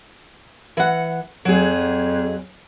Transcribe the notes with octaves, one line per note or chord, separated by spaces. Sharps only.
E3 F#5
F2 F#3 G#4